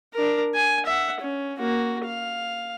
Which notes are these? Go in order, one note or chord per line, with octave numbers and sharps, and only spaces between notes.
D4 A#4
G#5
E5 F#5
C#4
A#3 F#4
F5